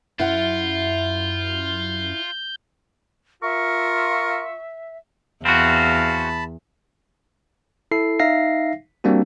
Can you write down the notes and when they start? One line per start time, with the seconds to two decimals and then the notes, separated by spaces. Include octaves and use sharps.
0.20 F#2 E4 F4 F#5 G6
3.43 F4 A#4 E5 C#6
5.45 E2 C4 F#4 F5 A5 B5
7.91 E4 A4 C7
8.19 D#4 E5 F5 A#6 C7
9.04 G3 A#3 C4 D4 F#4